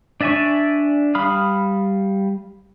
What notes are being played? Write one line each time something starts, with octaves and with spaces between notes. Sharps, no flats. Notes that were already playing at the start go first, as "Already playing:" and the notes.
D4 D5 E5 G#5 C#6
G3 F5 B5 D#6 F6